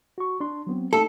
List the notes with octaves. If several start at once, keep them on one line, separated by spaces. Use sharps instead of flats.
F#4 C#6
D4 C6
F#3 B3 C4
A3 D#4 A4